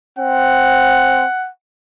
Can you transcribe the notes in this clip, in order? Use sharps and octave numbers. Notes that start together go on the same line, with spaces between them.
C4 F#5